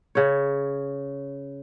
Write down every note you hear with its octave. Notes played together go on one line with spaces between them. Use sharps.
C#3 C#5